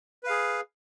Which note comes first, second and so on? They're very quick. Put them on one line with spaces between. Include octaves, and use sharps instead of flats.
B4 F5 G#4